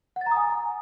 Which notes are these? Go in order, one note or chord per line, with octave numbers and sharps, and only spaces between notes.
F#5
A6
A#5
D#6
G#5